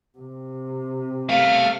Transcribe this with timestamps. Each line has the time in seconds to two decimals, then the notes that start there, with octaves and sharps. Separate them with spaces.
0.18 C3
1.29 A3 A#4 F5